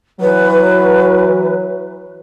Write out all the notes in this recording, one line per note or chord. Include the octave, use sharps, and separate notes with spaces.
E3 F#3 B4